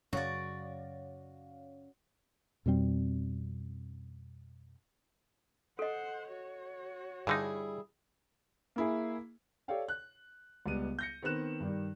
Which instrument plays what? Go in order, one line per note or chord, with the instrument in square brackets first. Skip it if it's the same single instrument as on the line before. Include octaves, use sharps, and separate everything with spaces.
[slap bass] F#2 C#3 F#3 [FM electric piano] C#4 C#5 F5 [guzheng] F#4 D5
[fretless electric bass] F2 B2 G3 C4
[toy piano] A4 D#5 [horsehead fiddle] C5 F#5
[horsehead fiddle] F#4 C#5
[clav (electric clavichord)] G2 D3 D#4 [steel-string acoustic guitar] G3 E4 G#4
[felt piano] A#3 E4 G#4
[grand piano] G4 A4 C#5 D5 F5 G5
F#6
C#2 G3 B3 D#7
G6 A#6 C#7
D#3 B3 C4 B4 F#6 E7
G2 D#3 G3